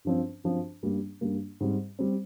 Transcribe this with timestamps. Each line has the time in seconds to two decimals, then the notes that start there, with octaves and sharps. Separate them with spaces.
0.05 G2 F3 C4
0.44 G2 F3 C4
0.83 G2 G3 A#3
1.21 G2 G3 A#3
1.60 G#2 G3 C4
1.99 G3 C4